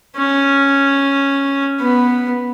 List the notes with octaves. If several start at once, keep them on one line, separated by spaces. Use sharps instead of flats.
C#4
B3